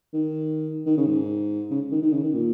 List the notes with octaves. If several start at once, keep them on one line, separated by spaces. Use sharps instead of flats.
D#3
D#3
C#3
G#2
C#3
D#3
D#3
C#3
D#3
A#2